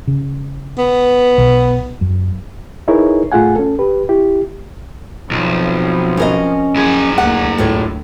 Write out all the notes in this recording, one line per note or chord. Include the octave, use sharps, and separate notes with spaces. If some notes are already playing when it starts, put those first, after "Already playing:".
C#3
B3
B1
F#2
D#4 E4 G#4 A#4 B4 C#5
A2 A3 F4 G#4 F#5 G#5
C#4 A4
G4 B4
E4 G4
B1 F3 C4
C#4 A#4 D#5
F#2 F3 G#4
D2 A#3 F#5
D2 A2 F4 C#5